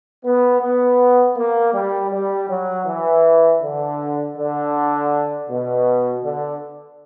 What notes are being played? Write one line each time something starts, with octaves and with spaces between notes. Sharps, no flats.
B3
B3
A#3
G3
G3
F#3
E3
D3
D3
B2
D3